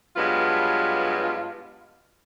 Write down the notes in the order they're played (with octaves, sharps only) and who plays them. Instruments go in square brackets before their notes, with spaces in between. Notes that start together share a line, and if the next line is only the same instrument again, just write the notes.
[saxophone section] G2 F#3 G#3 B3 F4